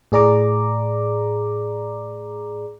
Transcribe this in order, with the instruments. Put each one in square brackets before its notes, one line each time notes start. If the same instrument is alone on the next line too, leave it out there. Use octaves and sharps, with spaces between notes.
[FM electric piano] A2 G#4 D5 A#5 D6